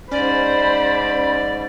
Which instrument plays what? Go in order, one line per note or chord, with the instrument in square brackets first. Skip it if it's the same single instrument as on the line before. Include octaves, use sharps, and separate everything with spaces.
[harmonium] G#2 [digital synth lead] C#4 [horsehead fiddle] C5 B5 [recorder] D5